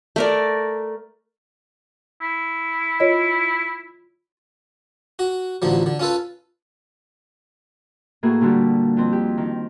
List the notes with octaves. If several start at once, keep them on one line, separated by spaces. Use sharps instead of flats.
A3 A#4 D5
E4
F4 C#5 D#5
F#4
A1 D3 F3 F#3
D3
C#4 F4 A4 B4
A2 A#3 F#4 G#4
A#2 D3 G3 F#4 G4
F2 C4
G4
D#3